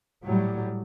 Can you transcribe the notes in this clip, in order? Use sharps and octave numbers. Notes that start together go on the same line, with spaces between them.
A2 F#3 G3